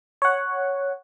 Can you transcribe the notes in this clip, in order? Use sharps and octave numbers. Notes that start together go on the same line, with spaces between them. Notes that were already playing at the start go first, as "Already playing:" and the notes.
C#5 F#5